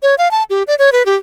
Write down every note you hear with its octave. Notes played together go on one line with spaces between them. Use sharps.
C#5
F5
A5
G4
D5
C#5
B4
G4